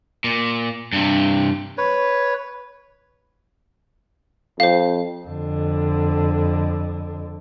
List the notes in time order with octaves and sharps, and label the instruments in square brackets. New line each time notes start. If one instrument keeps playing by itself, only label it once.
[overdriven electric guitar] A#2
G2 C3
[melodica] B4 C#5
[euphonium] F2 [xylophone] C5 F5
[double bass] F2 D3